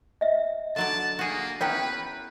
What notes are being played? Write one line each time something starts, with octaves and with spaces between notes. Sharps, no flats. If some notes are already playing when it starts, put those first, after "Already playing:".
D#5 E5
D3 F#3 D5 A5
A#3 F#4 G#4
B3 C#4 E4 B4 C#5 G5 A#5